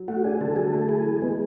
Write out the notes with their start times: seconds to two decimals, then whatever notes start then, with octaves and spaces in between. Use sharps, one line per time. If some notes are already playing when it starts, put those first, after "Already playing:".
Already playing: F#3
0.08 A3 F#4
0.24 D4 G#4
0.41 D3 A4
0.56 F#3 G#4
0.68 A4
0.73 A3
0.78 A4
0.89 E4 G#4
1.06 E3
1.22 G#3 B3